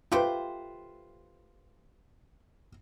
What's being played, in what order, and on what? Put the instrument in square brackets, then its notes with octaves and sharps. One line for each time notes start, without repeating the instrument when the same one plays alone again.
[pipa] A3 G4 C5 [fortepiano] F4 B4